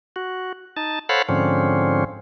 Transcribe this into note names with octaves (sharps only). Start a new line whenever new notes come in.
F#4
D#4 A5
A4 C5 C#5 F5 F#5 B5
G#2 D3 F3 C4 C#4